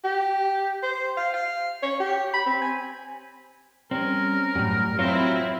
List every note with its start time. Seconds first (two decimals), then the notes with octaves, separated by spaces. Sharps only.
0.05 G4
0.83 C5
1.17 F5
1.34 F5
1.82 C#5
2.00 G4
2.34 B5
2.46 C4
2.62 G#5
3.91 G3 C4 C#4 A#4
4.55 F#2 A2 G3
4.99 F#3 C4 E4 F4 A#4 C#5